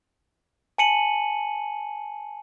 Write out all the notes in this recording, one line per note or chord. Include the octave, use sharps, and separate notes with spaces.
G#5 A5 C#7 D#7 F#7